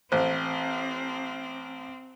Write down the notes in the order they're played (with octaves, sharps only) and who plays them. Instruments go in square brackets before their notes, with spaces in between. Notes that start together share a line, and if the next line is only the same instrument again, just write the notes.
[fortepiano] A1 [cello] C4 [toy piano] C5